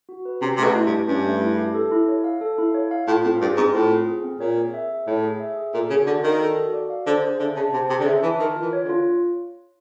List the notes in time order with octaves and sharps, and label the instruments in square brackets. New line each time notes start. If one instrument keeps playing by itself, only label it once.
[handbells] F#4
B4
[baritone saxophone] C3 [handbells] C#4
[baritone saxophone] C3 [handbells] A3
[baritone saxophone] B2
[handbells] E4
[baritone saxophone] G2
[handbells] G4
[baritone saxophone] G2 [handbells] C#4
[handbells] A3
E4
G4
A4
E4
C#5
F5
A4
E4
C#5
F5
[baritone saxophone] A2 [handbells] F4
[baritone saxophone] A2 [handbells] C4
[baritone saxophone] G2 [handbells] G#4
[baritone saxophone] G#2 [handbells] C4
[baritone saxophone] A2 [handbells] F4
[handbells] C4
G#4
C4
[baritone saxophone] A#2 [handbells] C#5
[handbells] G#4
E5
G#4
[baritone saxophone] A2 [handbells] C#5
[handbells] G#4
E5
G#4
[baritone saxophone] A#2 [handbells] A4
[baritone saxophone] C#3 [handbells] F#4
[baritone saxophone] D3 [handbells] D5
[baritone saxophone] D#3 [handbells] F5
[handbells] A4
F#4
D5
F5
[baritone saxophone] D3 [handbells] C5
[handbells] G#4
[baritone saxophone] D3 [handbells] E5
[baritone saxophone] C#3 [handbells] A5
[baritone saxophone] C3 [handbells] C5
[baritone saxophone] C3 [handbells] G#4
[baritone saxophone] D3
[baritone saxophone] C#3 [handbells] E5
[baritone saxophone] E3 [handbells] A5
[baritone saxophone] D#3 [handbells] A#4
[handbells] F4
[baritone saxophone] E3
[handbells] C#5
[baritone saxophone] D3
[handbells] F4